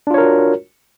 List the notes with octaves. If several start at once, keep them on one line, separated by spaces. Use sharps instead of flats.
D4 F4 F#4 A#4 C#5